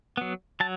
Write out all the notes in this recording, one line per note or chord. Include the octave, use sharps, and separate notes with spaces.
F#3 B3
F#3 A5